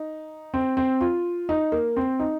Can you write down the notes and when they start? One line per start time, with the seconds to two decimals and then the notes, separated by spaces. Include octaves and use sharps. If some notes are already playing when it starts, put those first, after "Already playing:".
Already playing: D#4
0.54 C4
0.77 C4
1.01 F4
1.49 D#4
1.72 A#3
1.97 C4
2.20 D#4